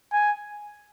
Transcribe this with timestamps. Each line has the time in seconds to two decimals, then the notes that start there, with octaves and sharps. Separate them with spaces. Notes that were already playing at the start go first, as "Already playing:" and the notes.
0.12 G#5